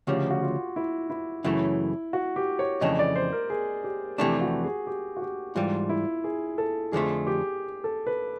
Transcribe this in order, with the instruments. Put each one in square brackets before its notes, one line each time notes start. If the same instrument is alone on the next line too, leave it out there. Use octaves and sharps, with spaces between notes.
[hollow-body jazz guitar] D2 C#3 F3 [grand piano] G4
[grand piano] F#4
F4
E4
E4
[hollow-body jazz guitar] F#2 C#3 E3 A3 [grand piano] E4
[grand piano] F#4
G4
C#5
[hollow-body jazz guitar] F2 C#3 E3 A3 D4 [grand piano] D#5
[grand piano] D5
C5
A#4
G#4
G4
[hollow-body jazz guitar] F2 C3 E3 A3 D4 [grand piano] G4
[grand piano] F#4
G#4
G4
F#4
G4
[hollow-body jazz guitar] G#2 E3 G3 [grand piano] F4
[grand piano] E4
G#4
A4
[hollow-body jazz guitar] F2 D3 F3 A3 [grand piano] G#4
[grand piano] G4
A4
B4